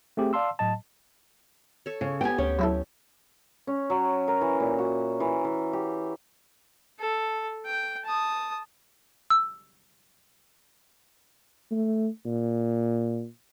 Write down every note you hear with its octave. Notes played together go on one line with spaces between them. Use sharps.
A3 C4 G4 G#4
D5 F5 A5 C6 E6
A2 F#3 D#5 A5
A4 C#5
C#3
B3 G4 G5 G#5
D2 C#4 C#5 G5
F#3 E4 A4
C#4
F#3
A#4
E3
A#2
F#4
E3
E3
G4
A4
G5
A5 D#6
E6
A3
A#2